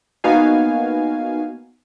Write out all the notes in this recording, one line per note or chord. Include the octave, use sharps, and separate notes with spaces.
A#3 B3 D#4 F#4 F5 G#5